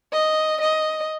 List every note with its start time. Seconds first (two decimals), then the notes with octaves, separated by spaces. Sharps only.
0.13 D#5
0.61 D#5